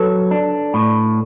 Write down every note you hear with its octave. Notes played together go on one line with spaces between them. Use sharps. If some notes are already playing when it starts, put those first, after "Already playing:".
Already playing: F#3 A4 B4
D4
A2